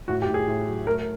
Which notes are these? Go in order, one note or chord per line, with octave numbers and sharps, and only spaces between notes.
A2 F#4
G4
A2
G#4
A2
F#3
A3 A#4